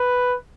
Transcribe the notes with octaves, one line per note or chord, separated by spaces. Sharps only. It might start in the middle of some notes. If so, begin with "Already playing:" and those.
Already playing: B4